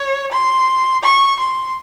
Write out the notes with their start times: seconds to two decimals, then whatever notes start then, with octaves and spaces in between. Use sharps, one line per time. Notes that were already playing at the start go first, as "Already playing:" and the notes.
Already playing: C#5
0.31 C6
1.03 C#6
1.39 C6